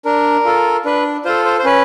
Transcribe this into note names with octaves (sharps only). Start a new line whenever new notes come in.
D4 A#4
F4 A4
D4 B4
F4 A4 C5
C5
C5
C#4 B4